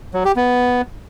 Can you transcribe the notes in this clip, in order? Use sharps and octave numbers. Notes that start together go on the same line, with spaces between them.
F#3
G4
B3